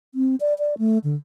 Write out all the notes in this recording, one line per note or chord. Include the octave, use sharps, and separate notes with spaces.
C4
D5
D5
A3
D3